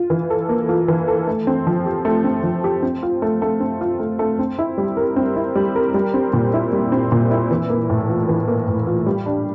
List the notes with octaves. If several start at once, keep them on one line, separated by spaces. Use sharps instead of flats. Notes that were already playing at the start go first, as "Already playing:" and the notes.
Already playing: F4
E3
A4
A#3
F4
E3
A4
A3
C4
F3
G4
A3
C4
F3
G4
C4
F4
A3
A3
C4
F4
A3
A3
C4
E4
G3
A#4
C4
E4
G3
A#4
G3
C4
A#2
E4
G3
C4
A#2
E4
E3
A#3
A2
F4
E3
A#3
A2
F4
G3
D4